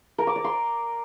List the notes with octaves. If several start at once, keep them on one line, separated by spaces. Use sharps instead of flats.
A#4
D6
D5
C6